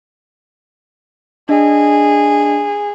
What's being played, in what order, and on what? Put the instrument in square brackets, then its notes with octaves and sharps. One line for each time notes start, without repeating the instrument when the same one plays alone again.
[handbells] D4 D#5 [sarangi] G#4